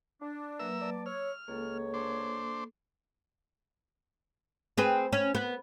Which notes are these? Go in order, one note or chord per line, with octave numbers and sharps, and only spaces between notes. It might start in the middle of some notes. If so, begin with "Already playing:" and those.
D4
F#3 A#3 A#4 B4 E5 E6
D5 A5 D6
C#5 E6 F6
C#2 A#3 A4 C#5
D4 C5
C4 G#4 B4
C#4
B3